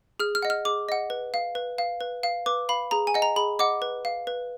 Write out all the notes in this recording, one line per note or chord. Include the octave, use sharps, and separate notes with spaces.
G#4 F6
F6
D#5 F#5
F6
G#4 D6
D#5 F#5
B4
F5
B4
F5
B4
F5
B4 D6
F5 B5
G#4 A#5
G#5
D#5 F#5
A#5
G#4 B5
D#5 F#5 D6
B4
F5
B4